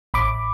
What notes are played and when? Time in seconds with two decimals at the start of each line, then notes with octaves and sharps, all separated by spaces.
0.14 A1 B5 D6